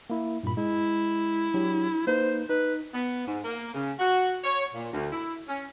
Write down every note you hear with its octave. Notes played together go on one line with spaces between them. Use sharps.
A#3 E4
G2 A#2 B5
G#3 E4
F#3 D4 G4
A#3 D#4 B4 C5
D#4 B4
B3
G#2
A#3
C#3
F#4
C#5
A#2
D2
E4
C#4